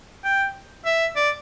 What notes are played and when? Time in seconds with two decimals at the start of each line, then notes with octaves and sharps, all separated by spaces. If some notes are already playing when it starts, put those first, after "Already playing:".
0.24 G5
0.85 E5
1.16 D5